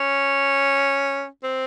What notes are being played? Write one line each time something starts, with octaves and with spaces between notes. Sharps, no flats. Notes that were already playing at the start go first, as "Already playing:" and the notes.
Already playing: C#4
C4